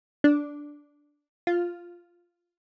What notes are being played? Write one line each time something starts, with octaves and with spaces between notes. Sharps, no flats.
D4
F4